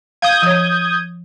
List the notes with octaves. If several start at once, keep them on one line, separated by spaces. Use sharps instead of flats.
F5 D#6 G6 G#6
F3 C#5